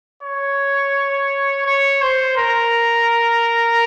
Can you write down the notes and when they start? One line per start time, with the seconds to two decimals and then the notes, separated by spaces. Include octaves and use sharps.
0.23 C#5
1.65 C#5
2.02 C5
2.37 A#4